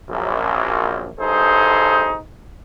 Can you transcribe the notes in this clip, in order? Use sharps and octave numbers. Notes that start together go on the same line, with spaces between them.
A#1 F#2
B1 G2 D#4 G#4 A4 C5